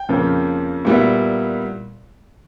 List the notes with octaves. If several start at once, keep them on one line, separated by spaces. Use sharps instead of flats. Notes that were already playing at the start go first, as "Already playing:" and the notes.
Already playing: G5
F2 C#3 F3 A#3
A#2 G3 B3 E4